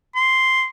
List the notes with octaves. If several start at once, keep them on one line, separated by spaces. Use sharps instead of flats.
C6